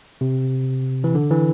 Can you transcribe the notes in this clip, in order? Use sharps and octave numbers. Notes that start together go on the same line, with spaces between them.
C3
E3
D3
E3